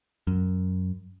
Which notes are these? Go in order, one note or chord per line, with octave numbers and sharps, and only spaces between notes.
F#2